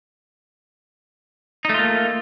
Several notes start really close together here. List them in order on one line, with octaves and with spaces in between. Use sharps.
D#4 A3 F4 A#3